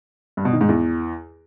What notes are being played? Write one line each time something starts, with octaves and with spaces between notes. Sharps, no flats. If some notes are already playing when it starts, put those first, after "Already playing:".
G2
B2
D#3
G#2
E2